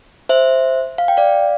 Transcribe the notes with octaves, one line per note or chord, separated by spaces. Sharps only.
C5 E5
F5
G5
D5 F5